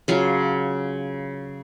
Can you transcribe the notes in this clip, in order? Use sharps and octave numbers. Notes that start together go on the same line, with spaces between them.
C#3 F#3 F4